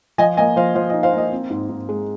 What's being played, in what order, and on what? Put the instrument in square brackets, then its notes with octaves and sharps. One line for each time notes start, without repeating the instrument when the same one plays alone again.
[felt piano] F3 D#5 G#5
A#3 D#5 G#5
F3 C5 F5
F3 C5 F5
D#5
D#4
C5 F5
A#3 D#5
C4
G#2
G#2
G#3